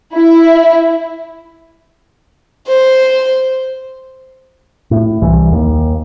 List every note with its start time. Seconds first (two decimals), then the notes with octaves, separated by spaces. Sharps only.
0.14 E4
2.67 C5
4.91 A2
5.22 C2 E3
5.52 D#2